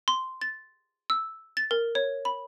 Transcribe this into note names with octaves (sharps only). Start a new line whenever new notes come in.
C6
A6
E6
A6
A#4
C#5
B5